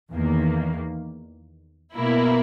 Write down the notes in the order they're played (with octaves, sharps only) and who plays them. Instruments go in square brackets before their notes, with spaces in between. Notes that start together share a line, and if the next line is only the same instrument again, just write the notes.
[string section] E2 D#3 A#3
B2 A#3 E4 A#4